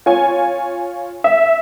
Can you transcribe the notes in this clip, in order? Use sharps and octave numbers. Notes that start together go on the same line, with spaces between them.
F4 C#5 G#5
E5